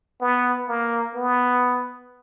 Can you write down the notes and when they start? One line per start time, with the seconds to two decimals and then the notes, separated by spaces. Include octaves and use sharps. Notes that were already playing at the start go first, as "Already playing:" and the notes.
0.21 B3
0.68 A#3
1.15 B3